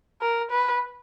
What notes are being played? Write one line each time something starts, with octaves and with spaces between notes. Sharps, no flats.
A#4
B4